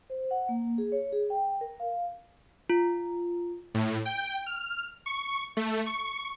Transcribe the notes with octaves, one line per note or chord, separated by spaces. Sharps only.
C5
F#5
A#3
G#4
C#5
G#4
G5
A#4
F5
F4
A2
G5
F6
C#6
A3
C#6